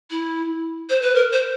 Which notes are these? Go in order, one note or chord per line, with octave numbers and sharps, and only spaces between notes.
E4
C5
B4
A#4
C5